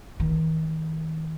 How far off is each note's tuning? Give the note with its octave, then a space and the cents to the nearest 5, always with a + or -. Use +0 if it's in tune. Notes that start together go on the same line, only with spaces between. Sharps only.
D#3 +40